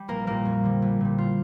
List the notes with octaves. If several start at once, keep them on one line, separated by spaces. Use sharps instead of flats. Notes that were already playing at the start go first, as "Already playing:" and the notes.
Already playing: G3
A#1 A#3 A#4
A#2 G3 A#3 A#4
F2
D3 G3
A#1
A#2 G3
F4